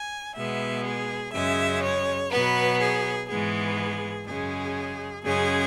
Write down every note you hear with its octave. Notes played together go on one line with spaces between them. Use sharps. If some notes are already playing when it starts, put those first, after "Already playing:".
Already playing: G#5
B2 G#3 B3 E5
G#4
F#2 C#3 G#3 E5
C#5
B2 F#3 B3 B4
G#4
G#2 E3 G#3 B3 G#4
F#2 C#3 G#3 G#4
F#2 C#3 G#3 G#4